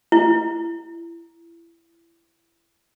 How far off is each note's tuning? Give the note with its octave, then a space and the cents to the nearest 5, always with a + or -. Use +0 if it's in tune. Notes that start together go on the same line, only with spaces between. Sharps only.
E4 +25